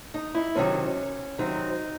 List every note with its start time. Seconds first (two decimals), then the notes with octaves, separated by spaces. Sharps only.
0.14 D#4
0.35 E4
0.55 C3 D#3 F#3 C4 C#4
1.38 C3 D#3 F#3 C4 D#4